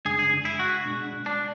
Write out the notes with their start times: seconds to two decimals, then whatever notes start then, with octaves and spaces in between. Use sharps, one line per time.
0.05 F#2 C#3 G#3 D4 G#4
0.19 G#4
0.45 E4
0.59 F#4
0.85 B2 G#3 D4
1.26 D4